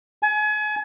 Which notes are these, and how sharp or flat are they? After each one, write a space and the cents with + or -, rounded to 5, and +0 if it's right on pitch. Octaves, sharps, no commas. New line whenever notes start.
G#5 +35